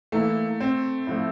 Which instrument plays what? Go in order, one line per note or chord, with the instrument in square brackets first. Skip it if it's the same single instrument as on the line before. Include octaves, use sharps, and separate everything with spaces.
[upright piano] E3 A#3 E4 [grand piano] A3
[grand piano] C4
[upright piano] A2 F3 A3 E4